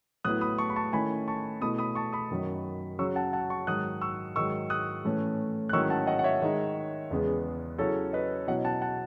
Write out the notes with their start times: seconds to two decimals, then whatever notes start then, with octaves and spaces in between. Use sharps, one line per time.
0.24 A2 F#3 B3 E4 D#6 F#6
0.41 B5 D#6
0.58 A5 C#6
0.70 B5
0.76 A5 C#6
0.93 D#3 A3 C#4 E4 G#5 B5
1.28 A5 C#6
1.61 B2 A3 E4 B5 D#6
1.78 B5 D#6
1.95 A5 C#6
2.12 B5 D#6
2.31 F#2 D#3 F#3
2.99 C#3 F#3 C#4 C#6 E6
3.16 F#5 A5
3.33 F#5 A5
3.50 A5 C#6
3.67 G#2 D#3 F#3 D#6 F#6
4.01 C#6 E6
4.36 G#2 D#3 F#3 C#6 E6
4.70 D#6 F#6
5.05 A2 E3 A3 C#4
5.69 F#6
5.73 G#2 D#3 F#3 C#4 E4 C#6 E6
5.90 F#5 A5
6.07 D#5 F#5
6.19 F#5
6.24 C#5 E5
6.42 D#3 G#3 D#4
7.11 E2 C#3 G#3 B3
7.78 C#3 F#3 C#4 E4 A4 C#5
8.13 B4 D#5
8.47 B2 F#3 C#4 E4 D#5 F#5
8.65 F#5 A5
8.82 F#5 A5